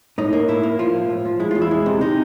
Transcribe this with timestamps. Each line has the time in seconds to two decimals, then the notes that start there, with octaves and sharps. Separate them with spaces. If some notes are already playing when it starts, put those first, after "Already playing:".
0.18 A2 D#4
0.33 A#3
0.48 A2 E4
0.63 A#3
0.79 F3 F4
0.94 A2
1.10 A2
1.25 F3
1.40 G#3 E4
1.51 E2 F4
1.62 E4
1.71 G#3
1.86 C3
2.01 C3 D#4